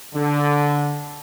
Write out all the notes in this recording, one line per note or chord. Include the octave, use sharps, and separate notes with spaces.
D3